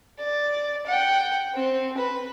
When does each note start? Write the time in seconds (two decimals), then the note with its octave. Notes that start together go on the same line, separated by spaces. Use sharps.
0.19 D5
0.87 F#5 G5
1.55 C4
1.97 B4